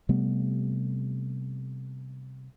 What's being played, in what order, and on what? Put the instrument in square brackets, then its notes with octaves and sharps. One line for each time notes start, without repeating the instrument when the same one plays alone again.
[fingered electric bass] C3 G3 A3 B3